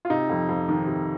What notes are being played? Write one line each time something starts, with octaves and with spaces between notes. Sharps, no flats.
F4
C3 D#4
F2
F2
D#3
C3